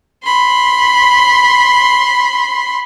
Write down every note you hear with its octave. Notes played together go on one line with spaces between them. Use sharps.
B5 C6